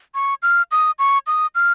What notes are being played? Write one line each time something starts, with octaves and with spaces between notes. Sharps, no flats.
C#6
F6
D#6
C#6
D#6
F6